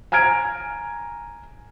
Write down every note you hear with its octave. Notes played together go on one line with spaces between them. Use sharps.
G#5 A#5 F6 G#6 D7